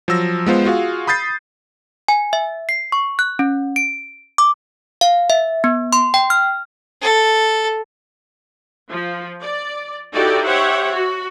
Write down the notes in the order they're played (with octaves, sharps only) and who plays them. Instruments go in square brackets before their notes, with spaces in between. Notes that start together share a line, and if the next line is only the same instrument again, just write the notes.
[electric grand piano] F3 F#3 E6 A#6
G#3 B3 F4 C5
F4 F#4 G#4 F5
B5 D#6 G6 A6 C7
[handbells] G#5
E5
C7
C#6
F#6
C#4
D7
D6
F5
E5
B3
C6
G5
F6
[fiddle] A4
[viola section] F3
D5
D#4 E4 F#4 G4 A4 D5
G4 C5 C#5 E5 F#5
F#4